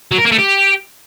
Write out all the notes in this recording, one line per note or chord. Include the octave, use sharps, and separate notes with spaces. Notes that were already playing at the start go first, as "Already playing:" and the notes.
F#3
A#4
A#3
A3
G4